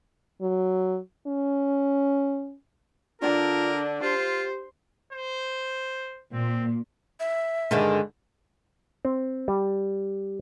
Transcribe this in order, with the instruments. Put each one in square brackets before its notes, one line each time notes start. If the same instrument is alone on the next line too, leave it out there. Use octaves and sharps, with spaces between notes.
[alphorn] F#3
C#4
[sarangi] D3 [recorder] D4 [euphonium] F4 [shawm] A#4
[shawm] F4 [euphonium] G4 [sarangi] C5
[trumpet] C5
[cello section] A#2 [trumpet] C4
[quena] E5
[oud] G2 D3 D#3 [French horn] G#3
[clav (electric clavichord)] C4
G3